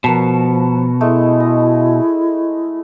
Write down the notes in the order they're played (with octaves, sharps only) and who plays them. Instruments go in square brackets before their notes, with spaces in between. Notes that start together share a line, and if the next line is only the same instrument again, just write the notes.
[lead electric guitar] B2 [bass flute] F3 [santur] A#4 C#5 A5
[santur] G#3 A3 [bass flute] E4
[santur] D#5